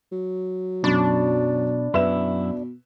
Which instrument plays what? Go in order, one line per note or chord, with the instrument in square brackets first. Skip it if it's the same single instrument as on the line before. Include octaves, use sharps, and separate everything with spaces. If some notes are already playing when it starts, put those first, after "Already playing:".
[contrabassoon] F#3
[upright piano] F#2 A6 [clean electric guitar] B2 [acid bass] D4
[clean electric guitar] F#2 E4 [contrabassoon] B2 [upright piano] B4 E5 E7